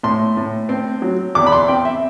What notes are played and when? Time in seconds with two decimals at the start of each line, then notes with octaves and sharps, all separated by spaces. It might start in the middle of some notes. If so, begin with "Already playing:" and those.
0.03 A2 C6
0.37 A2
0.69 C4
1.02 F#3
1.35 E2 D6
1.46 B5
1.52 C6
1.68 C4 G5
1.85 E5